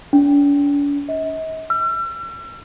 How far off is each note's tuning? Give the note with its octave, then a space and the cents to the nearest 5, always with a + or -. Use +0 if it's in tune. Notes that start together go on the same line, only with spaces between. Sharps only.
D4 -45
D#5 +45
E6 +45